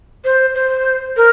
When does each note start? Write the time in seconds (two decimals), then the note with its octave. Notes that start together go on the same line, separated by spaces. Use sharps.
0.25 C5
0.55 C5
1.17 A#4